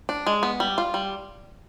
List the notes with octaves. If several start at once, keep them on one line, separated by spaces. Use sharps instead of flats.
D4
G#3
B3
G3
F4
G3